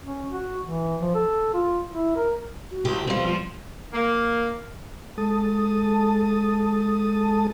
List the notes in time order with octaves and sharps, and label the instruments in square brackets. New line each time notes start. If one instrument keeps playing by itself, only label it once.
[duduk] C#4
F#4
E3
F3
A4
F4
E4
A#4
[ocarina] F#4
[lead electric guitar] C2 [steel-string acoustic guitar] G4
[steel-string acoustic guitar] B2 G3 [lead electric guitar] C4 F4
[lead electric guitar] F3 [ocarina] F4
[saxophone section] A#3
[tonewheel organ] G#3 A4 A5 D#6